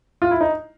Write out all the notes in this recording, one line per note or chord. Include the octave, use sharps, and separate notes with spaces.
F4
E4
D#4